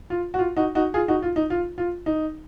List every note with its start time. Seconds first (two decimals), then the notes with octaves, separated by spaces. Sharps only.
0.10 F4
0.34 F#4
0.39 F4
0.57 D#4 F#4
0.75 D#4 F#4
0.94 F4 G#4
1.08 D#4 F#4
1.22 F4
1.36 D#4
1.50 F4
1.78 F4
2.06 D#4